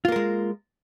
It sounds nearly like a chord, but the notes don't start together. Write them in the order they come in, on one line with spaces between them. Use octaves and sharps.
F4 A#3 A#4 G#3